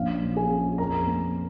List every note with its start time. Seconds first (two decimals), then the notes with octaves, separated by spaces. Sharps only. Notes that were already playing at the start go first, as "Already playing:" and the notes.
Already playing: A#1 C#4 F5
0.22 F3
0.37 G#4 G#5
0.51 C#4
0.78 F2 A#4 A#5
1.07 A#3